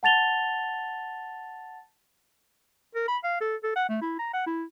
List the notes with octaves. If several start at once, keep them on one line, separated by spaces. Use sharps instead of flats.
F#5 A5 A6 F7 G7
A#4
B5
F5
A4
A4
F#5
A3
E4
A#5
F#5
E4